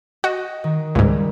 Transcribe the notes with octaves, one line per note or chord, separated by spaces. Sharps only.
F#4 D#5
D#3
C#2 G#2 G3